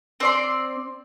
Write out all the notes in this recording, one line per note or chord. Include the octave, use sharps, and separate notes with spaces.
C4 D5 C6